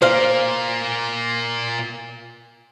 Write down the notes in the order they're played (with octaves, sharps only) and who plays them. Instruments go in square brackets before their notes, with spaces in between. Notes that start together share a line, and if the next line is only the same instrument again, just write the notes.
[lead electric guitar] A#2 A#3 [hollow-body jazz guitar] C5 F5